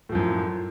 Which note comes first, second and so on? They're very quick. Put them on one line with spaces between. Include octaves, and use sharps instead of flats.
A2 F3 F#2